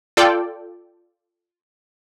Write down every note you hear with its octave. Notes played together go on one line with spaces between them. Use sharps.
F4 A4 D5 G5